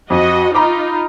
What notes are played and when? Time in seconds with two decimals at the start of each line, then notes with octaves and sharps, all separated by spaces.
0.10 F2 F#4 D#5
0.54 D#4 F4 A#5 B5 D6